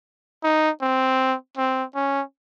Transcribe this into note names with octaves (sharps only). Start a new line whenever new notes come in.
D#4
C4
C4
C#4